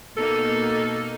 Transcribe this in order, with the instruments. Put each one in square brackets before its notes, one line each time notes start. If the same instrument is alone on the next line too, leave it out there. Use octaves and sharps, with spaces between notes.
[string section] B2 A#3 D#4 [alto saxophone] A4